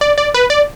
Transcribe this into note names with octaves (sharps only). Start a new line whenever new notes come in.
D5
D5
B4
D5